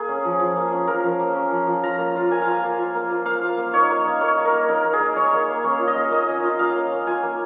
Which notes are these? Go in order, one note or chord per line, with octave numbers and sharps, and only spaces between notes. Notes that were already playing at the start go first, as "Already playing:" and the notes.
Already playing: A#3 G#4
C#4
F3
F3
A#3
C#4
F3 A#4
F3
A#3
C#4
F3
F3
F4 A#5
A#3
F4
A#3 G#5
F5
F4 G#5
A#3
F4
A#3
F4
A#3 F5
F4
A#3
D#4 C#5
A#3
D#4
A#3 C#5
D#4
A#4
A#3
D#4 A#4
A#3
G#4
D#4
A#3 C#5
D#4
A#3
C#4 C#5
F4
D#5
A#3
A#3 D#5
C#4
F4
A#3 F5
A#3
C#4
F4 G#5
A#3